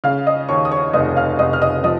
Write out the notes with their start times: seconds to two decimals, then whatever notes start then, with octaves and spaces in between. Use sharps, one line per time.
0.04 C#3 F5 F6
0.27 D#5 D#6
0.49 D#2 C#5 C#6
0.65 D#6
0.71 C#5 C#6
0.93 F1 D#5 D#6
1.16 F5 F6
1.39 F1 D#5 D#6
1.53 F6
1.61 D#5 D#6
1.84 F3 D#5 D#6